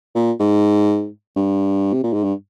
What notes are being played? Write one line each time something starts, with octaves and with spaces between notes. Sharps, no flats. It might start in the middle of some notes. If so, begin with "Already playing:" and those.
A#2
G#2
G2
C3
A#2
G#2
G2